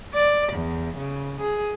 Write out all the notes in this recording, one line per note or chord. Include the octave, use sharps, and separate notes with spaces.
D5
E2
C#3
G#4